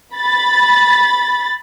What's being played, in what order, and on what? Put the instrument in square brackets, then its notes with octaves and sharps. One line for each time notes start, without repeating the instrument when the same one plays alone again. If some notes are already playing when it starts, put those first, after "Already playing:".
[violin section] B5 A6